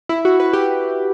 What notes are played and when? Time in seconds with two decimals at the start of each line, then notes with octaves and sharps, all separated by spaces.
0.09 E4
0.25 F#4
0.40 B4
0.53 G4